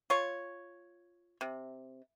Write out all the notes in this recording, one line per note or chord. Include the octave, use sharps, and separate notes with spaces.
F4 C#5
C3